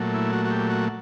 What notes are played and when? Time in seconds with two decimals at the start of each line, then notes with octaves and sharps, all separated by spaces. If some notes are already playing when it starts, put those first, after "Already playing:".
Already playing: A#2 F#3 A3
0.14 E4
0.33 F#4
0.45 F#4
0.51 G4
0.70 F#4